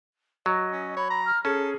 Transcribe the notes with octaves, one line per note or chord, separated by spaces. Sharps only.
F#3 D#5
C#4
C#5 B5
A#5
F6
C#4 G#4 A4